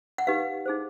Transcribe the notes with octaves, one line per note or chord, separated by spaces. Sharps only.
F#5
D#4 G4 B4 F5
D#4 G#4 C5